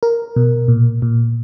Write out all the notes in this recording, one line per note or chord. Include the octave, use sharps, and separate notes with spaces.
A#4
B2
A#2
A#2